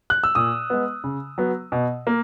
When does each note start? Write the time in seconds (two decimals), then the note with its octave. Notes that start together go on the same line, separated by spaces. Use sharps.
0.10 F#6
0.24 E6
0.35 A#2 D#6
0.70 G#3 B3
1.04 C#3
1.38 F#3 B3
1.72 B2
2.07 A#3